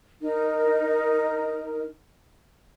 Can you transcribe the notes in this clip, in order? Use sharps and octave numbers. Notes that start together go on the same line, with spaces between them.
D#4 A#4